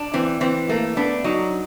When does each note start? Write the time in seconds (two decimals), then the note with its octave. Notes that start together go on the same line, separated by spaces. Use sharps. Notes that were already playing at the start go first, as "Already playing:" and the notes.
Already playing: D4
0.14 E3 C4
0.41 E3 C4
0.69 A3 A#3
0.97 B3 D4
1.24 F#3 D#4